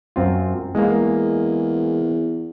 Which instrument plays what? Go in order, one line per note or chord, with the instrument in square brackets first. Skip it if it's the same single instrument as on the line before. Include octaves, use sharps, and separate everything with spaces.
[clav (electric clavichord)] F#2 C4 F4
[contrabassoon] E2 [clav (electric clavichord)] G#3 A#3